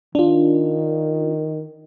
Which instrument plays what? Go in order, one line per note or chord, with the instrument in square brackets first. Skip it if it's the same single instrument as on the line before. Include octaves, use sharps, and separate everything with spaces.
[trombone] D#3 [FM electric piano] D4 F4